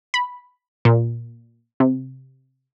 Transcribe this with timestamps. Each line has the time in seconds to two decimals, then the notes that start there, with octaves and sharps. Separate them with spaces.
0.14 B5
0.85 A#2
1.80 C3